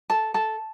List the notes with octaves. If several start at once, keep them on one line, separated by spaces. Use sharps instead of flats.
A4 A5
A4 A5